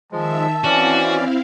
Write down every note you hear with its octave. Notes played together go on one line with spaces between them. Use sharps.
D#3 F3 G#3 E5 A5 E6
E3 C4 C#4 E4 F#4 D5 F5